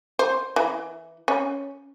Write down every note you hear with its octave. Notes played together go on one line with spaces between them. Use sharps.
C5
E3
C#4